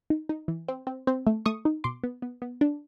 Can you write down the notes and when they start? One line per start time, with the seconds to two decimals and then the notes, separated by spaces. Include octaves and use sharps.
0.10 D#4
0.29 D#4
0.48 E3
0.68 C4
0.87 C4
1.07 C4
1.27 A3
1.46 A3 C#6 D#6
1.65 D#4
1.84 B2 C6 D6
2.04 B3
2.22 B3
2.42 B3
2.61 D4